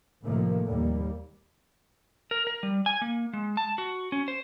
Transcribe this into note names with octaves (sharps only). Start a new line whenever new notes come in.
A2 C3 D#3 F3 A3 A#3
D#2 G3 A#3
A#4
A#4
G3
G#5
A#3
G#3
A5
F#4
C#4
C5